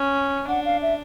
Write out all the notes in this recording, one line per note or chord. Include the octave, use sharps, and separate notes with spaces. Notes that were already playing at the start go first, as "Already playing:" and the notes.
Already playing: C#4
D4 F#5
F5
E5